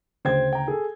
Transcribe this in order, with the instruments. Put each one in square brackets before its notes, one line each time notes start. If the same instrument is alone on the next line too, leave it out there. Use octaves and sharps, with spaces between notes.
[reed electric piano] D2 C#3 [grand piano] C5 G5 G#6
[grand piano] G5 A#5
G#4 A4